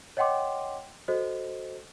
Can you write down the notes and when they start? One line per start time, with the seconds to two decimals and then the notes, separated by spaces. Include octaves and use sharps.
0.17 C#5 D#5 F#5 G5 C6 D6
1.08 F#4 A4 C5 D#5